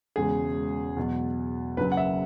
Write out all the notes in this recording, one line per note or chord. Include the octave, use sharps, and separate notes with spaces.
E1 E2 C#3 G#3 G#4
E2 B2 F#3
F#1 F#2 F#3 B4
F#5
E5